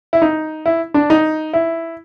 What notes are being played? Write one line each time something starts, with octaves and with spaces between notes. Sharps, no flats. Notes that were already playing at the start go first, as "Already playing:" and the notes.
E4
D#4
E4
D4
D#4
E4